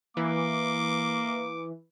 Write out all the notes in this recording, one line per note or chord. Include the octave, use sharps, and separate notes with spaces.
E3 A#3 D6